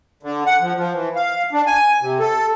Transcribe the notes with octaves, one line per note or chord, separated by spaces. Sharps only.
D3
F#5
F3
F3
E3
F5
D4
G#5
C3
A4